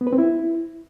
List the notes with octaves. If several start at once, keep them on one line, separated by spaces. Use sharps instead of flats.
B3
B4
C4
E4